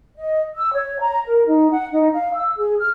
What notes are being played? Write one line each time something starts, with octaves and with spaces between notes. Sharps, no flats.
D#5
E6
C#5
A#5
A#4
D#4
F#5
D#4
F5
E6
G#4
F6